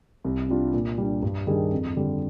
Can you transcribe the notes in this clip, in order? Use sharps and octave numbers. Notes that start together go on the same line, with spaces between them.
C2
C3 G3 D4 F4
A#2
G3 D4
G2
D#3 G3 D4 G#4
F2
D3 G3